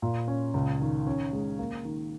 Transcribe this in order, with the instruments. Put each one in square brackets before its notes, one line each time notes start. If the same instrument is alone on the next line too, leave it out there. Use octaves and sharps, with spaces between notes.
[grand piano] A#2
C#4
C#2
D#3
C#4
G#3
A#3
D#3